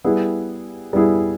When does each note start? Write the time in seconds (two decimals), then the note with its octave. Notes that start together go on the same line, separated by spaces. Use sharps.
0.04 G3 B3 E4 G#4
0.93 G3 B3 E4 G#4